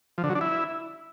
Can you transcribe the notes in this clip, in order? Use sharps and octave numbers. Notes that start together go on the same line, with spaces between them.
F3
D3
F#3
D4
E4